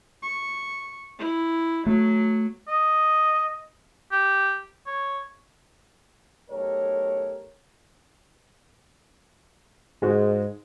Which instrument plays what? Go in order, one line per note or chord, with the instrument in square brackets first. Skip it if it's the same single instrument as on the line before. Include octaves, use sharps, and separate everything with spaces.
[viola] C#6
E4
[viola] F#3 [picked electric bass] A3
[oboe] D#5
G4
C#5
[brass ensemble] B1 A3 G4 A#4 C#5
[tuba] G#2 [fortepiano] G#3 F#4